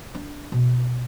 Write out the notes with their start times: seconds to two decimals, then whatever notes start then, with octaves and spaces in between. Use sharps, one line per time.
0.15 D4
0.52 B2